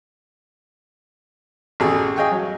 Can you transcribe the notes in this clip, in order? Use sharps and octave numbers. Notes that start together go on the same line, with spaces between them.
A1 B2 G#4 A4
G#4 D#5 F5 G5 G#5 C#6
F#3